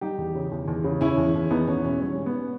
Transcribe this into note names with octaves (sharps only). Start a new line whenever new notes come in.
G3 D#4 G4
E2
C#3
E2
E2
C#3
E2 C#4 E4
E2
E2
E2 B3 D#4
E2 C#4
B2 C#4
G3 C#4
G#2
B3